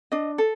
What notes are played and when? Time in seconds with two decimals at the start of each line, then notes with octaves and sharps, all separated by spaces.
0.12 D4 D#5
0.38 A4